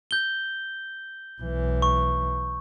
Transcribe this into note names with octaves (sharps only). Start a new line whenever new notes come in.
G6 G7
B1 E3
C#6